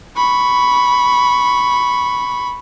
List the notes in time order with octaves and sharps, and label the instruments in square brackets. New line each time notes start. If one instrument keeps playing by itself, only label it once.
[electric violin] B5 C#6